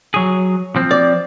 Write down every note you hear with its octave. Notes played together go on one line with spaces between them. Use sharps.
F#3 G#4
F3 C4
D5